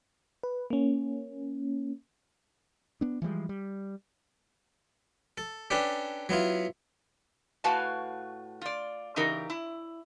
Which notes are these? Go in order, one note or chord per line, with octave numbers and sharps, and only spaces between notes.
B4
A#3 C#4
B3 D4
E3 F3 G3 G#3
G3
A4
C#4 D4 G4 A4 B4
F#3 B3 E4 F4
A2 F#4 B4 F5 G#5 A5
F4 D5
C#3 E3 D#4 G4 A#4
E4